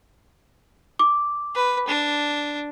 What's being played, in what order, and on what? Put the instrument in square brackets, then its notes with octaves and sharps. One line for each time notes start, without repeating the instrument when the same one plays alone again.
[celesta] D6
[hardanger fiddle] B4
D4